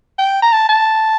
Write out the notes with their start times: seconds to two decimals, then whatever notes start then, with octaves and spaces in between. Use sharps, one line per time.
0.18 G5
0.43 A#5
0.52 A5
0.69 A5